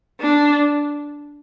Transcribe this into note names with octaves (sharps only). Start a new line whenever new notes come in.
D4